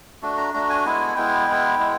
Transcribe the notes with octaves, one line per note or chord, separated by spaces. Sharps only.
A3 D4 F#4
A#5
A3 D4 F#4 A#5
G#5
G#3 B3 E4
G#3 B3 E4 G5
G#3 B3 E4
G#3 B3 E4